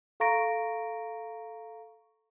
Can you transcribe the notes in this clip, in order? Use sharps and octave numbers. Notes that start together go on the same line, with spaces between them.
A4 F5 A#5 C#6 A#6 D7